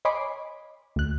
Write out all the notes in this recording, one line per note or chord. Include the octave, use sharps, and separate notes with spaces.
C#5 D#5 G#5 B5 C6 D6
D2 F#6